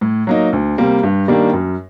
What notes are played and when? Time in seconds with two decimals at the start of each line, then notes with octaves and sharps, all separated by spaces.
0.01 A2
0.27 F#3 A#3 D#4
0.53 D2
0.78 C3 G3 A#3
1.03 G2
1.28 D#3 G3 A#3 D4
1.53 F#2